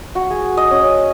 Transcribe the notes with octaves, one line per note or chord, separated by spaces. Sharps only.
F#4
G#4
D#5
C#4